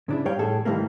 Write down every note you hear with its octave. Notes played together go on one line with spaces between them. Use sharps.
C#3 D4 E4
G2 G3 C#5 F5 G5
A2 E3 G#4 A4
G#2 D#3 E3 G3 A3 A#3